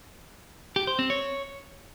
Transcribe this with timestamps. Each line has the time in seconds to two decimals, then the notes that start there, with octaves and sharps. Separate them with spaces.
0.76 G4
0.87 C5
0.99 C4
1.10 C#5